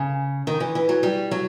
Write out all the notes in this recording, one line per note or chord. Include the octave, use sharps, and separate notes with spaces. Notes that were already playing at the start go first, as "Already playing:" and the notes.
Already playing: C#3
D#3
E3
E3
F#3
G3
F#3